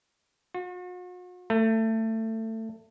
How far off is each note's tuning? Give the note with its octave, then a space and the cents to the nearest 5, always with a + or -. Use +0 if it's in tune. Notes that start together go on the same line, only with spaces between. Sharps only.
F#4 -45
A3 +20